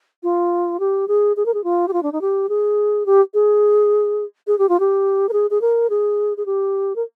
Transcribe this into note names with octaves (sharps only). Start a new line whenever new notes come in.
F4
G4
G#4
G#4
A#4
G#4
F4
G4
F4
D4
D#4
G4
G#4
G4
G#4
G#4
G4
F4
G4
A#4
G#4
G#4
A#4
G#4
G#4
G4
A#4